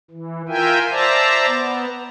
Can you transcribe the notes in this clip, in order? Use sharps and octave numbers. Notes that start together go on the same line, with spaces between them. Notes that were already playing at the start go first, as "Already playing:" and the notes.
E3
F4 A#4 E5 G5 G#5
C5 D5 E5 A5 A#5
B3